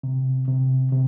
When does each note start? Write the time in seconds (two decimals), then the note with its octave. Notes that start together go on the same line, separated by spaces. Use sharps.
0.03 C3
0.48 C3
0.92 C3